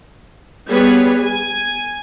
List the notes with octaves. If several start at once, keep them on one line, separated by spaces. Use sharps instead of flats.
G3 B3 G#4 B4 C#5
G#5